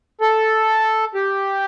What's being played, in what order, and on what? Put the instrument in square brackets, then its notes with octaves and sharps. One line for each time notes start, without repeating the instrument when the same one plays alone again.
[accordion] A4
G4